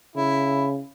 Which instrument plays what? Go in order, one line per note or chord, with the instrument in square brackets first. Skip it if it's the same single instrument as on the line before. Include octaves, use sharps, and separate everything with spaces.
[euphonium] C#3 [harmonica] E4